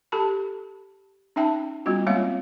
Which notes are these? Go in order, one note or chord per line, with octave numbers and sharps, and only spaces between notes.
G4 A4 A5 B5
C#4 D#4 E5 G5 A5
G3 B3 C#4 F4 F#4
G#3 A#3 C4 F4 C#5 F5